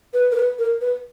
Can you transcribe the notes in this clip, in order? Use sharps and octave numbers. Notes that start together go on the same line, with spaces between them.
B4
A#4
B4
A#4
B4